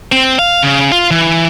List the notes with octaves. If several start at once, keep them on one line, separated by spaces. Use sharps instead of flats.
C4
F5
C#3
F4
E3